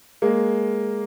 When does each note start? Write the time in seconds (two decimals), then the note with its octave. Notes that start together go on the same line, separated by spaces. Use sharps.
0.22 G#3 A#3